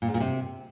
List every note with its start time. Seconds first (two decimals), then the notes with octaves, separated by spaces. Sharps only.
0.02 A#2
0.08 G#2
0.14 A#2
0.20 C3